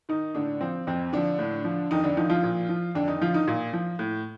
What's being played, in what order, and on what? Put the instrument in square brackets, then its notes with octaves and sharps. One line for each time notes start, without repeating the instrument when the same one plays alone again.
[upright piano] D#3 D#4
A2 D3 D4
F3 C4
F2 C4
D3 F3 D4
A2
F3
F2 D#3 D#4
D3 D4
D3 D#3 F3 D#4
F3 F4
A#2
F3
F2 D3 D4
D#3 D#4
D3 F3 F4
D#3 D#4
A#2
F3
A2